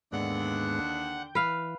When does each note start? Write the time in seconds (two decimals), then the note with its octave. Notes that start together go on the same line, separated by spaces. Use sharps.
0.13 D#2 G#2 D3 G#3 B3 D4 F#5
0.99 G5
1.35 E3 B4 F5